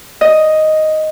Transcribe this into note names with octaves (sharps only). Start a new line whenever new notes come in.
D#5